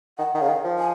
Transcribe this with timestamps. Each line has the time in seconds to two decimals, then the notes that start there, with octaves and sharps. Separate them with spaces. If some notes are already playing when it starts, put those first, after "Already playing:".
0.18 D#3 F#5
0.34 D#3
0.39 C#3 F5
0.49 D#3
0.64 F3
0.79 G#5